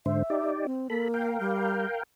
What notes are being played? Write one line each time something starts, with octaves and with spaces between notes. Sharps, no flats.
G#2 D3 C5 E5
D#4 G4 D5
C4
A#3 A4 B5
A#4 F5 G5
G3